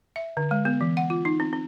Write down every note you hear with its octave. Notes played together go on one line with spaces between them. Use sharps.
E5
D3
G#3
B3
E3
F#5
F4
D#4
C4
C4